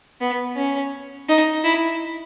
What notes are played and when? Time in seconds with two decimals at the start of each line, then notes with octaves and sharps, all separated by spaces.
0.21 B3
0.57 C#4
1.29 D#4
1.64 E4